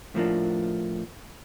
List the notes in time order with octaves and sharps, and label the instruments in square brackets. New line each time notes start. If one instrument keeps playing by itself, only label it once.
[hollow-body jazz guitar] A2 F3 A#3 D4